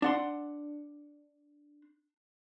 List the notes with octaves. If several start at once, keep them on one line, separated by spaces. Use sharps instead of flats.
D4 F#5 C6